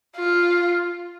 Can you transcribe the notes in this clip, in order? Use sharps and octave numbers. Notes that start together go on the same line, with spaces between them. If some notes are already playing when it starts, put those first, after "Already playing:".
F4